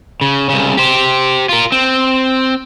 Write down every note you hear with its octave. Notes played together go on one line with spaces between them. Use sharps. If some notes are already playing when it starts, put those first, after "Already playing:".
C#3
C2 C#3
G4 C5
F4 A#4
C4